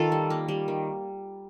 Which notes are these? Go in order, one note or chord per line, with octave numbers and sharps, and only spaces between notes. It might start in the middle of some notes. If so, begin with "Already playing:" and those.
Already playing: D#3 F4 A4
G3
A#3
G3
D#3